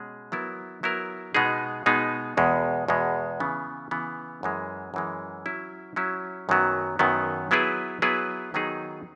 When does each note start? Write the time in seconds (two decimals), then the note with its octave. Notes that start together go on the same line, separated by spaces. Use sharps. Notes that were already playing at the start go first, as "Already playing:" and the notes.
Already playing: B2 G#3 C#4 G#4
0.32 F#3 B3 E4 A#4
0.83 F#3 B3 E4 A#4
1.35 B2 G#3 B3 D#4 G#4
1.86 B2 G#3 B3 D#4 G#4
2.37 E2 B2 G#3
2.88 E2 B2 G#3
3.40 C#3 E3 B3
3.91 C#3 E3 B3
4.43 F#2 E3 G#3
4.94 F#2 E3 G#3
5.46 F#3 C#4 E4
5.96 F#3 C#4 E4
6.49 F#2 D#3 F#3 B3
6.99 F#2 D#3 F#3 B3
7.51 F#3 B3 E4 G#4 B4
8.02 F#3 B3 E4 G#4 B4
8.54 D#3 F#3 B3 D#4 G#4